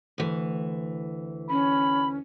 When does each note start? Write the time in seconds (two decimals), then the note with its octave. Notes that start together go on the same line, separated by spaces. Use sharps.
0.18 D2 E3
1.50 C#4 B5